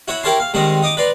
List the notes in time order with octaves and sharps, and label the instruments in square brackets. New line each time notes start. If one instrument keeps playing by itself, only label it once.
[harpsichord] E4 F#4 C#5
E4 G4 A#4 C#5 A5 C6
F5
G#2 D#3 G3 C4 A#5
D#4 D#5 D6
B4 D5 A#5 C6